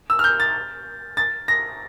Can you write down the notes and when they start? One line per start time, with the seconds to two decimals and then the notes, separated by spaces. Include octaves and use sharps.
0.10 E6
0.19 F6
0.24 G6
0.40 A6
1.17 A6
1.48 A#6